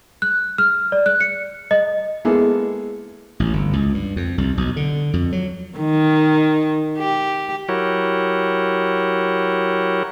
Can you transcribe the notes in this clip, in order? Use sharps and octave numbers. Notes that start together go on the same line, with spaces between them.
F#6
F6
D5
F#6
C#7
D#5
G#3 A#3 B3 E4 G#4 A4
A1
G1
C#2
G2
F2
C2
B1
D3
F2
F#3
D#3
G4
F#3 E4 F#4 G4 A#4 C#5